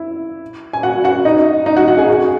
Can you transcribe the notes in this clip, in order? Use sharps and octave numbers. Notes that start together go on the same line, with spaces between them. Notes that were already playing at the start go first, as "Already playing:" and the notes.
Already playing: E4
G#5
F#4 F#5
F#4 F#5
D#4 D#5
D#4 D#5
F#4 F#5
F#4 F#5
G#4 G#5
F#4 F#5